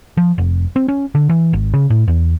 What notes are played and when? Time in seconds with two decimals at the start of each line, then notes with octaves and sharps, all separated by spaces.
0.17 F3
0.38 F1
0.76 C4
0.88 C#4
1.15 D3
1.29 E3
1.53 G#1
1.74 C#3
1.90 A2
2.08 E2